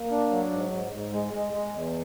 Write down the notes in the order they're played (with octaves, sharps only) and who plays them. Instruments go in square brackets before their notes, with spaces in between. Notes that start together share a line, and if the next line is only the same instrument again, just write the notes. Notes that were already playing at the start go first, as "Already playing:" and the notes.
Already playing: [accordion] A#3
D4
F#3
G#2
G#2
G#2
G#3
G#3
G#3
E2